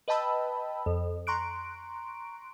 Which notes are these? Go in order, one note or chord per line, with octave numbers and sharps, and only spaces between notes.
B4 D#5 G5 A5 B5 E6
F2
A#5 C6 C#6 F#6 D7